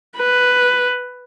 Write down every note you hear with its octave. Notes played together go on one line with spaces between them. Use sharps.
B4